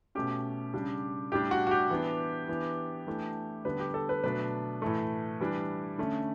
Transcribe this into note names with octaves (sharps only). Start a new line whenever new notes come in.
B2 A3 C#4 G4
C#3 G3 D4
A2 G3 D4 G4
F#4
F#4
G4
E3 B3 D4
E3 B3 D4
E3 A3 D4
D3 G3 B3 D4 B4
G4
A4
B4
B2 F#3 A3 D4 B4
A2 E3 A3
E3 G3 D4
D3 A3 C#4